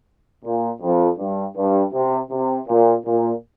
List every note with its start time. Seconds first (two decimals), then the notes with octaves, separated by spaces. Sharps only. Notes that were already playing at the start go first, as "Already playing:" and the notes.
0.44 A#2
0.82 F2
1.18 G2
1.56 G2
1.93 C3
2.31 C3
2.68 A#2
3.05 A#2